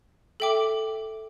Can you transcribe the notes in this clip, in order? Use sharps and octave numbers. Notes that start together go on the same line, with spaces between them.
A4 E5 G5 D6